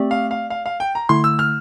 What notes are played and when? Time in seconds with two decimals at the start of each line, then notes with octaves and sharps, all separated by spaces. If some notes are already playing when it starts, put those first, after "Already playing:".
Already playing: A3 C4 G4 D5
0.11 F5
0.31 F5
0.50 F5
0.66 F5
0.80 G5
0.95 A#5
1.09 D3 A3 E4 C6
1.24 E6
1.39 F6